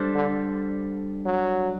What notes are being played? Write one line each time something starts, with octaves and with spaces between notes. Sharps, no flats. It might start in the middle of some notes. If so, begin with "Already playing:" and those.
Already playing: G3 D4 A4 C5
D3
F#3